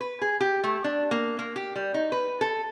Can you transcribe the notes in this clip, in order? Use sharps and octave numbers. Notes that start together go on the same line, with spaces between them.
B4
G#4
G4
A3
D4
A#3
A#3
G4
G3
D#4
B4
A4